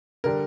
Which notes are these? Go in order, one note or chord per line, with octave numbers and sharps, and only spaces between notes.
D3 G3 A#4